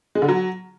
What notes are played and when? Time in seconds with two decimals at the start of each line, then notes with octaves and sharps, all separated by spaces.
0.15 G#3
0.22 D3
0.28 F#3